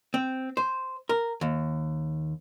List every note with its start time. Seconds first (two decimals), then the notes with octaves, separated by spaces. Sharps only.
0.14 C4
0.57 C5
1.09 A#4
1.41 D#2